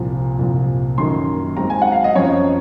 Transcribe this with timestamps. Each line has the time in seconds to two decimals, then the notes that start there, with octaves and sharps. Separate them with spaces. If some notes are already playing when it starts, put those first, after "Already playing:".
Already playing: C2 A#2 F3
0.39 C2 A#2 F3
0.98 F#2 D#3 F#3 A#3 C6
1.57 G#2 F#3 C4 A#5
1.70 G#5
1.82 F#5
1.92 F5
2.04 D#5
2.15 F#2 F3 C4 C#5